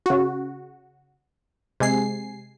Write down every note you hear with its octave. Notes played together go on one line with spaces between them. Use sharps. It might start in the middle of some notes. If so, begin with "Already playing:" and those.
C#3 F#4
C3 G#3 G#5 C7